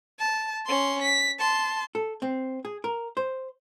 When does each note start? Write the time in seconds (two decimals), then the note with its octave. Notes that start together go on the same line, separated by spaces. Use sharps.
0.20 A5
0.66 C#4 C6
1.02 B6
1.39 A5 C6
1.95 A4
2.22 C4
2.65 G#4
2.84 A#4
3.17 C5